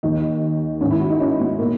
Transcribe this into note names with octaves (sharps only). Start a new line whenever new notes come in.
D#2 D#3 D#4
G#2 D#3 C#4
E4
F#4
D#4
C#4
B3
B2 A#3